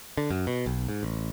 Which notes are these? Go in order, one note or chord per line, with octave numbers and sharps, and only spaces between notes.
D3
F#2
B2
B1
G#2
A1